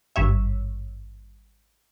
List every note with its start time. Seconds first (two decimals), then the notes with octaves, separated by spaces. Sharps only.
0.16 G#1 G2 C#5 E5